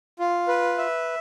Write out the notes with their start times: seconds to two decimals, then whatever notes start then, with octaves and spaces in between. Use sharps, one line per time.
0.19 F4
0.48 B4
0.78 E5